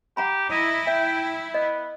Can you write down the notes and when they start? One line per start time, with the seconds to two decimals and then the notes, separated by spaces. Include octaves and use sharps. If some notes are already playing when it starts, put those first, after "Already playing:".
0.17 G4 F#5 A#5 B5
0.50 E4 D#5
0.87 E5 G5
1.54 B3 D#5